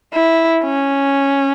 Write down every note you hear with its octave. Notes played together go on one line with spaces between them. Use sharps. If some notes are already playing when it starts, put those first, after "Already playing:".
E4
C#4